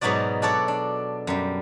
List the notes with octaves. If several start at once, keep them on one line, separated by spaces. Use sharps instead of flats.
G#2 B2 F#3 D#4 F#4 D5
D4 F#4 A4 C#5 D5
D4
F#2 G3